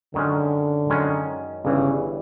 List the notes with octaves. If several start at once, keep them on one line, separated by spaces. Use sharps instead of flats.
F#2 D3 D#3 G#3 C#4
F#2 D#3 G#3 C#4
G1 G2 C#3 E3